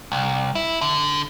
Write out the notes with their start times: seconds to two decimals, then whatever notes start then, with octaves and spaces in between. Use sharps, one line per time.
0.12 C2
0.55 E4
0.81 D3